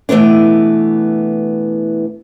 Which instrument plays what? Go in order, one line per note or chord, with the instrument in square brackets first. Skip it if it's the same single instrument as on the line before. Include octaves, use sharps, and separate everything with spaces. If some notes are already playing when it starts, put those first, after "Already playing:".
[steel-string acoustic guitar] B2 E3 A3 B3 D4